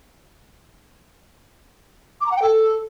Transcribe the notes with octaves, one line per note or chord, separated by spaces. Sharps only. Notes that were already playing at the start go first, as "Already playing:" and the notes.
D6
A#5
F#5
G5
A4